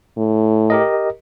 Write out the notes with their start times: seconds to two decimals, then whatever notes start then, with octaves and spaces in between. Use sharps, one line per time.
0.17 A2
0.70 G4 A#4 D#5